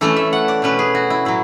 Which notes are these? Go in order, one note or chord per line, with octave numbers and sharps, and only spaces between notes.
E3 A3 C#4 A4
E5
F#5
D5
B2 A3 C#4 B4
G#4
F#4
E4
A2 F#3 E4